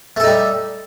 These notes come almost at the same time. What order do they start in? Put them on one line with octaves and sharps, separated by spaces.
A3 A4 D#4 G3